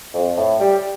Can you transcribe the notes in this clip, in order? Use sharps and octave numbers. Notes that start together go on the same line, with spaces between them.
F2
A2
G3